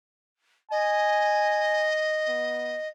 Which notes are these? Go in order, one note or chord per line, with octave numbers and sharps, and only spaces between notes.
D#5 G#5
B3